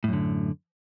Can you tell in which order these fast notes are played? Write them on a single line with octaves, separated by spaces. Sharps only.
A2 F#2 D3